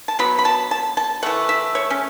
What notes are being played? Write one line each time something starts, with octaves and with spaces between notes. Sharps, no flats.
A5
B2 F#3 B3 B5
B5
A5
A5
A5
E3 A3 F#5
E5
C#5
C#4